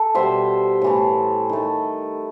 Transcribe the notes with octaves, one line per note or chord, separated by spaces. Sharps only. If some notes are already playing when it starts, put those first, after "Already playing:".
Already playing: A4
B2 G3 C5 E5
A2 E3 A3
D#3 A3